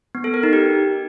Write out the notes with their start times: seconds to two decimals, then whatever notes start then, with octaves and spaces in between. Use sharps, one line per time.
0.15 B3
0.24 A4
0.34 A#4
0.43 D#4
0.53 G4